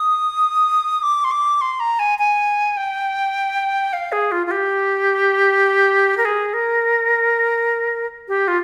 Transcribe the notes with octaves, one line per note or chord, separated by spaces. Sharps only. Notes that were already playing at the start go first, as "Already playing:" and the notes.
Already playing: D#6
D6
C6
D6
C6
A#5
G#5
G#5
G5
F5
G#4
F4
F4
G4
A#4
G#4
A#4
G4
F4